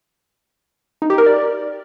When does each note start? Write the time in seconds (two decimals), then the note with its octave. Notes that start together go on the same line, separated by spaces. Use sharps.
1.02 D#4
1.10 G4
1.18 A#4
1.26 D5